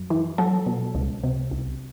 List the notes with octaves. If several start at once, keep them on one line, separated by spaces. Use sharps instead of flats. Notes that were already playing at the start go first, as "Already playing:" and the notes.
Already playing: F#2
E3
F#3 A4
B2
C#2
C3
C2